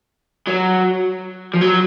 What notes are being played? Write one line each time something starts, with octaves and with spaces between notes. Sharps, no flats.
F#3
F3
F#3